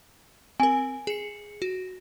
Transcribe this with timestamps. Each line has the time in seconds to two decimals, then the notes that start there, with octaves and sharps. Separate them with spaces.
0.60 C4 A#4 G#5
1.07 G#4 C#7
1.62 F#4